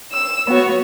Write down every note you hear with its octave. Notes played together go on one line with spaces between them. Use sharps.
E6
B3 F#4 C#5